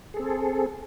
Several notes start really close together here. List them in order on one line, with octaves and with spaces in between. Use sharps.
G#4 A4 C4